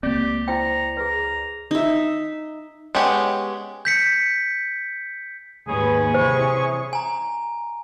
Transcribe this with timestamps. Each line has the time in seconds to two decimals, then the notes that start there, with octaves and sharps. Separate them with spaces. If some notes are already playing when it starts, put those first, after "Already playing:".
0.03 C#2 A#3 C4 G4 D5 G6
0.48 E4 C5 G5 A#5
0.97 G#4 B4 A#5
1.71 D#4 E5
2.95 G#3 B3 C#4 G4 C#5
3.85 G6 B6 C#7
5.67 D#2 G#2 C#4 G#4 B4
6.14 C3 E3 C5 C#6
6.93 G#5 A#5